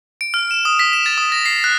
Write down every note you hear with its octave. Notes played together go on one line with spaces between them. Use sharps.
D7
F6
E7
D#6
B6
E7
A6
D#6
A#6
C7
F#6